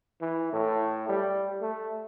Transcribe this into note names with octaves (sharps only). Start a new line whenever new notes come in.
E3
A2
G3
A3